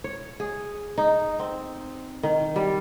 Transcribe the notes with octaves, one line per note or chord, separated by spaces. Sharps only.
C#5
G#4
D#4
C4
D#3
G3